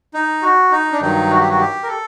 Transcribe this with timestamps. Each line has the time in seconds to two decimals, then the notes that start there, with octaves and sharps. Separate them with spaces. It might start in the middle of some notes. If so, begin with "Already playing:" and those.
0.14 D#4
0.42 F#4
0.72 D#4
0.92 D4
1.01 G2 D#3 F#3 D#4
1.31 F#4
1.40 G4
1.49 F#4
1.59 G4
1.83 A#4
1.88 A4